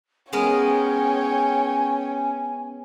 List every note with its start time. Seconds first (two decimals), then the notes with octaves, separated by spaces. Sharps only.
0.33 G#3 B3 C#4 A#4 C#5 G5 G#5